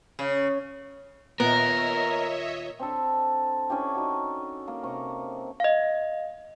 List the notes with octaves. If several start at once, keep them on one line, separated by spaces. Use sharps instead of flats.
C#3
D#2 A#2 B3 A#4 C#5 D#5 E5
C4 D4 A4
C#4 D4 E4 G4
D#4 F#4
A#3 A#4
C3 A#5 C#6
D#5 F5